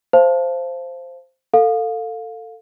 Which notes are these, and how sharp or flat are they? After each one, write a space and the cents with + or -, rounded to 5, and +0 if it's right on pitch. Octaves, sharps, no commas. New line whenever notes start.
C5 +0 F5 -25 A5 +0
A4 +20 F5 +20